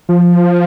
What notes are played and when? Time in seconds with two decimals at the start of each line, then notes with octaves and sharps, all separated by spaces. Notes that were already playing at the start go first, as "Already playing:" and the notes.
0.09 F3